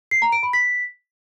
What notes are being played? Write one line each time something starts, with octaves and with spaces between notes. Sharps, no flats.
C7
A#5
D7
B5
B6